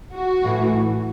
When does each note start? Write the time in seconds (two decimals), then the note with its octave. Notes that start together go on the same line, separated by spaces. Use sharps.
0.12 F#4
0.42 A2 E3 A3